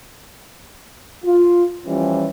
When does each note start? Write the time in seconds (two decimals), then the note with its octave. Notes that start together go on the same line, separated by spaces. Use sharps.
1.24 F4
1.86 E3 F3 G3 C#4